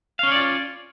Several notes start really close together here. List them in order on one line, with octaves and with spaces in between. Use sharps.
F5 C#4 C#5 D5 F4